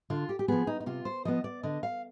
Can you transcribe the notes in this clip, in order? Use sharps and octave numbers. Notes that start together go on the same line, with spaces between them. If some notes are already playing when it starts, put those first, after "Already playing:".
D3 F4
G4
G4
F3 B3 G#4
D#4
D#4
C3 F4
C5
F3 B3 D#5
D5
D3 D#5
F5